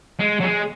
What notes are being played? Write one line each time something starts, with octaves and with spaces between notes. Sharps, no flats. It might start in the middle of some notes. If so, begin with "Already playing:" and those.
G#3
F#3
G#3